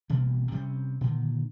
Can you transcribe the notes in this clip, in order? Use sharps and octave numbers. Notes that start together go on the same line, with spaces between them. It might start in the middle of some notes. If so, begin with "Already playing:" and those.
A1 B2 G3 A#3
C3 G3 C4 C#4
A#2 D3 D#3